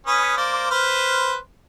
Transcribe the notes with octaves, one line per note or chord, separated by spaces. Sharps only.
C#4 B4 D#6
A#3 C5 D5
B4 C5 F6